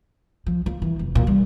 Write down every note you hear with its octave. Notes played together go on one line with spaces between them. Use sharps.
F3
F3
E3
F1
A#2
G3